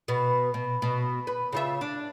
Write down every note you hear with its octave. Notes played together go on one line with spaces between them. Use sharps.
B2 B3
B2
B2
B4
C#3 F4 E5
D4